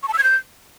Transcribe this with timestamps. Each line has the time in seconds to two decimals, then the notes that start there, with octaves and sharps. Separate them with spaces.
0.03 C#6
0.08 A5
0.13 E6
0.18 G#6
0.23 G6